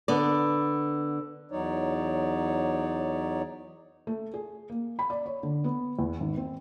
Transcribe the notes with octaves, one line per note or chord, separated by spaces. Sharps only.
D3 B3 D5
E2 F#3 D#4 C#5 D5
A3
G#4
A#3
B5
D5
C#5
D3
B3
E2
G#1
C4